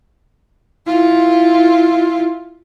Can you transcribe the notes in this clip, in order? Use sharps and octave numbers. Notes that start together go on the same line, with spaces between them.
E4 F4